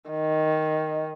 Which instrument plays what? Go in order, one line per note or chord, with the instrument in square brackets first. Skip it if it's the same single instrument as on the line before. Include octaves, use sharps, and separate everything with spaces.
[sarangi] D#3